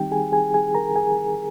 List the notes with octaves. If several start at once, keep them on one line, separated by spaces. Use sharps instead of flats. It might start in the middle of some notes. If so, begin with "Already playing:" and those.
Already playing: D#3 G3 C4 D#4 G4 G5
G#4 G#5
G#4 G#5
G#4 G#5
A#4 A#5
G#4 G#5